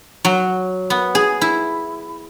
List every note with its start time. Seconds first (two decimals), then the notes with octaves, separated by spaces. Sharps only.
0.25 F#3
0.90 B3
1.15 G#4
1.41 E4